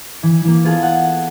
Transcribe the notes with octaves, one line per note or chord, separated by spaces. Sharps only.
E3
E3 A#3
B3 F4 G#4 A4
F#5